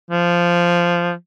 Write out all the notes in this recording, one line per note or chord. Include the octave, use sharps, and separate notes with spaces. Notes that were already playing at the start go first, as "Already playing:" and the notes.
F3